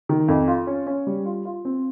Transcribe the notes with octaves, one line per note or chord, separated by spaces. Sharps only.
D#3
F2
F4
C#4
C#4
G3
F4
F4
C4